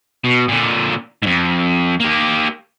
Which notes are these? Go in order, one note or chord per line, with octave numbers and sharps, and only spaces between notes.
B2
A#2 D3
F2 G#2
A#3 G4